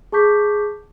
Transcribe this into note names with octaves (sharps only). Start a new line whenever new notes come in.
G#4 A5 C#6 D6 G6 B6